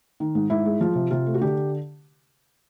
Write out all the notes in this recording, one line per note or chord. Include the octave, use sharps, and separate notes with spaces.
D#3
G#2
G#2 E4
G#3
F3 F4
C3
C3 F4
A3
F#4
D3 G4